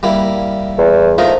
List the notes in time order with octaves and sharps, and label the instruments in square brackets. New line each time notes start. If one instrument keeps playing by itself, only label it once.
[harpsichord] G3 A#3 E4
[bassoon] E2
[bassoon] F3 [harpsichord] A3 D#4 A#4